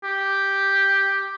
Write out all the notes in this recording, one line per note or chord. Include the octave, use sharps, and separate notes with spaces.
G4